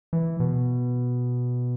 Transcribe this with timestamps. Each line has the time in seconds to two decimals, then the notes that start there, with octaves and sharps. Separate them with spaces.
0.13 E3
0.40 B2